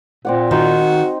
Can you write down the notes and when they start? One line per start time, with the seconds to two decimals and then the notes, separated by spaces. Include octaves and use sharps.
0.25 A#2 C4 D5 F#5
0.51 D#3 D#4 F#4 C6